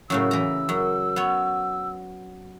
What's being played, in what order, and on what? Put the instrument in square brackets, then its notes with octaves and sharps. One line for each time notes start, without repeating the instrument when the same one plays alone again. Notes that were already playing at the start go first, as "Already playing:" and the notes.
[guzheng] F#2 A2 C#3 [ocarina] E6
[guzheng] E3 A#5
F#2
B3 C#5